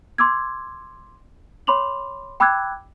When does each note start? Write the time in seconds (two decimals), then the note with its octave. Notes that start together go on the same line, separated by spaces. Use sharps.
0.18 C6 D6 E6 G#6
1.67 C#5 B5 C6 D6 F7 F#7
2.40 G5 B5 D6 E6 F#6 G#6